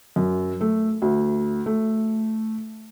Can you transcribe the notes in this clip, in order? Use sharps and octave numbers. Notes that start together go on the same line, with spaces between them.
F#2
A3
D2
A3